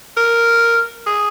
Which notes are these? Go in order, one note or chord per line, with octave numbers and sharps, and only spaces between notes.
A#4
G#4